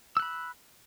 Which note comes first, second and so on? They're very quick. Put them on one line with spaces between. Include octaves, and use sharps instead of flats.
E6 F#6 B5